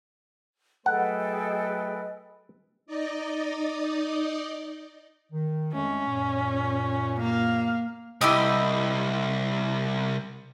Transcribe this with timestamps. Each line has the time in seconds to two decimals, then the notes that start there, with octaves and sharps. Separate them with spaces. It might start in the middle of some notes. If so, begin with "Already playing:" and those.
0.86 F#3 A3 G#4 A4 B4 D#5 F#5 G5
2.86 D#4 D5 D#5
5.32 D#3
5.73 F2 G#3 A3 C#4
6.07 F#2 A#2
7.20 A#3 F5
8.21 C2 E4 G4 D#5